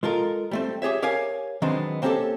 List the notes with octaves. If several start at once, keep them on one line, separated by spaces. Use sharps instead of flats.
G#3 F4 A4 A#4
G3 A3 C4
G4 G#4 C#5 E5
G4 A#4 C#5 F5 G#5
D#3 F#3 G#3 B3 C4 D4
A#3 C4 C#4 E4 G4 A4